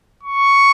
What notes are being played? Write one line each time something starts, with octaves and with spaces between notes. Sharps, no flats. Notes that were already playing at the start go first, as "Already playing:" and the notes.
C#6